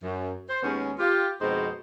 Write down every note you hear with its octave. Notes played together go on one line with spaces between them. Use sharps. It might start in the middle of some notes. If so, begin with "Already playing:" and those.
F#2
C5
D#2 G#3 B3 C#4
F4 G4
F2 B2 G#3 C4 D#4 C5